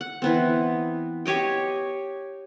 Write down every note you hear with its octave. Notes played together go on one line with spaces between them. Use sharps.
F#5
E3 B3 C4
G4 C#5 D#5 G5